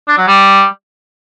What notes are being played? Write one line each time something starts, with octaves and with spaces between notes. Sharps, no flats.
D4
F#3
G3